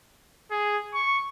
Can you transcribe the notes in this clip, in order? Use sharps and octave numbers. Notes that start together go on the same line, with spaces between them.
G#4
C#6